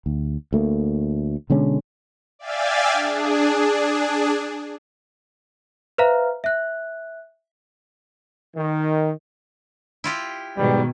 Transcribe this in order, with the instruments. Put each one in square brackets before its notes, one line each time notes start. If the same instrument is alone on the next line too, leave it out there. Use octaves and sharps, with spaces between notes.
[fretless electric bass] D2
D2 A3 A#3
B2 D3 G#3 C#4
[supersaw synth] D5 E5 F5 G5 G#5 A6
D4 G#4
[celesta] B4 C5 E5 F5 A#5 F6
E5 F#6
[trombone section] D#3
[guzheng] E4 F4 G4
[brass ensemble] G#2 F#3 B3 [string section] B2 D#3 [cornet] G3